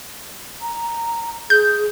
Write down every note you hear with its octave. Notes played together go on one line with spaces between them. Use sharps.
A#5
G#4 G6